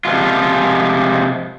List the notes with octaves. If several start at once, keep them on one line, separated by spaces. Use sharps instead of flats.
C3 F3 G#3 F4